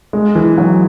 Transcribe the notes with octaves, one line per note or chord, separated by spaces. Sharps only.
G#3
E3
F#3